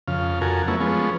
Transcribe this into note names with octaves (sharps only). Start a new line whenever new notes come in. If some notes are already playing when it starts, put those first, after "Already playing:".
F2 C#3 F5
F2 F#4 A4 A#4 G#5
F#3 A3 B3 C#4 E4
F3 G#3 B3 C#4